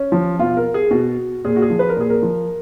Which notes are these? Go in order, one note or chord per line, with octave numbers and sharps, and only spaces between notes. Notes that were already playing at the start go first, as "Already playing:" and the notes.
Already playing: C#4
F3
B2 F4
A#4
G#4
B2 F#4
A#2 G#4
F#4
G#4
F3
B4
A#4
A#2 G#4
A#4
F3